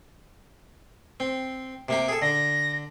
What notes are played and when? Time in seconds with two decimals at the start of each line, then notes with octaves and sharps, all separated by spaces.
1.20 C4
1.89 C3 A#3 G4
2.08 G#4 A4
2.22 D3 A#6